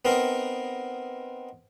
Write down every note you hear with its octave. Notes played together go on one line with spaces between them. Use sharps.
B3 C4 D#4 A#4